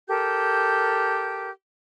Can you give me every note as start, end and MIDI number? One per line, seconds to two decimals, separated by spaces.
0.08 1.50 67
0.08 1.50 69
0.08 1.50 70
0.08 1.50 91